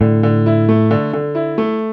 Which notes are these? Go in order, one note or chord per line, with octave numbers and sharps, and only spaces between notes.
A2 D3
D3
E4
A3
D3
D3
E4
A3